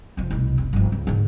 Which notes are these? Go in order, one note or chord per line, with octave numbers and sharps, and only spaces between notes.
F1 F3
C2 B2
F1
G1 F3
C#2
G#2 D3